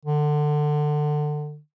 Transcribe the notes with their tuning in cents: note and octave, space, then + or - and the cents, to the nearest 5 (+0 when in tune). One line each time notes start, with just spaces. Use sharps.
D3 +25